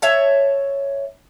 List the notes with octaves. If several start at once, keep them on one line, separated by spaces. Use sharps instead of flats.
C#5 E5 A5